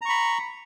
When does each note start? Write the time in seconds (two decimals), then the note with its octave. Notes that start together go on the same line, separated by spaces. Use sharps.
0.01 A#5
0.05 C#6
0.09 B5